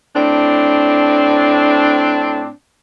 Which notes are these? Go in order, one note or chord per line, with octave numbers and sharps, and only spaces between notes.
A2 C4 D4